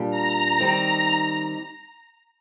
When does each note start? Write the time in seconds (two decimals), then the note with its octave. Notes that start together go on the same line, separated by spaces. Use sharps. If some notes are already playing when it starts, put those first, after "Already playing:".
Already playing: A#2 G3 D4
0.10 A#5
0.60 D#3 G3 C4 D#4